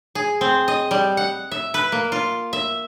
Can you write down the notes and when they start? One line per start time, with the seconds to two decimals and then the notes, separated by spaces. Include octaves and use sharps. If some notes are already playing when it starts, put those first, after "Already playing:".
0.15 G#4
0.41 C4
0.68 D#5
0.91 G3
1.17 F#5
1.51 E5
1.74 B4
1.92 A#3
2.12 F4
2.53 E5